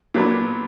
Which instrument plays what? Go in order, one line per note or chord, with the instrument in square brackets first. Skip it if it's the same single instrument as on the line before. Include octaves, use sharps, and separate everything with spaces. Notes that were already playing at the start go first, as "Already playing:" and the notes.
[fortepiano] A#2 F#3 B3 D4